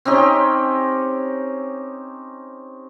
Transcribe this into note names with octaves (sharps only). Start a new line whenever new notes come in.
C4 C#4 D#4 G4